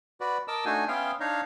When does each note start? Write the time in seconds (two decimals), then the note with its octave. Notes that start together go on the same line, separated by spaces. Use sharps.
0.21 F#4 B4 D5
0.48 A#4 D#5 A5 D6 E6
0.65 A3 D4 D#4 F#4 G#5
0.88 B3 C#4 E5 F5 G5 C6
1.20 D4 D#4 C#5 F5 A#5